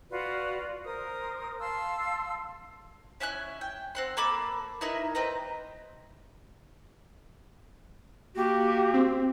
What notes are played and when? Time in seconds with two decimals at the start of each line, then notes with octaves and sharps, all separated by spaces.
0.10 F4 F#4 B4 D5
0.84 A#4 C5 D#6
1.59 F5 A5 C6 E6
3.20 C#4 E4 G#5 F#6
3.61 G5
3.95 C4 F#5 C6
4.17 A#3 A4 B5 D6
4.81 D#4 E4 A#4 B4
5.15 C4 D#4 B4 A#5
8.36 A#3 F#4 G4
8.94 C4